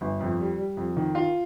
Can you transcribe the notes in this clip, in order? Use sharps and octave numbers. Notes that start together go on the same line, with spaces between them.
G1
F2
G3
G3
F2
D#3
F4